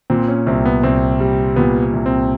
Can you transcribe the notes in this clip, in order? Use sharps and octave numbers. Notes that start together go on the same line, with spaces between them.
A#2 C4
C#4
C2 C4
B3
C2 C4
G3
A#2 B3
C2
C4